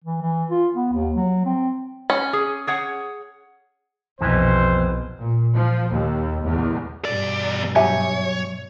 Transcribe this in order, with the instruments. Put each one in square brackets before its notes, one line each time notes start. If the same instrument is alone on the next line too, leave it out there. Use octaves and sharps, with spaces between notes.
[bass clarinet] E3
E3
F4
B3
D#2
F#3
C4
[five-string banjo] C#4
[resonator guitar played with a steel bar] G#4
G#4 C#5 F#5
[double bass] B1 B2 [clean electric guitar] F2 E3 [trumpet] C5
[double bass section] A#2
F3
D#2
E2
[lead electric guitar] E2 D5 [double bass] G2 B2
[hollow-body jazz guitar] F#3 G4 G#5 [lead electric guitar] C#5 [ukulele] E5